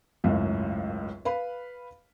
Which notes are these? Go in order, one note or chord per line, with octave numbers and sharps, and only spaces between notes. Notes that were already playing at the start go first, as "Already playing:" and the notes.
G#1 C#2 F#2 A2
B4 F5 B5